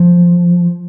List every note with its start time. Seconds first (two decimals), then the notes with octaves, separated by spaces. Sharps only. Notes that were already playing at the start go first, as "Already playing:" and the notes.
Already playing: F3